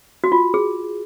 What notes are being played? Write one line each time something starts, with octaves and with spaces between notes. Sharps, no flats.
F#4
F4
G#4